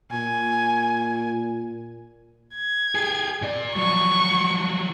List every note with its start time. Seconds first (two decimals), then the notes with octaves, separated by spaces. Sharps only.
0.12 A#2 G#5
2.55 G#6
2.95 G4 G#4
3.42 A#2 D5
3.76 F3 F#3 C#6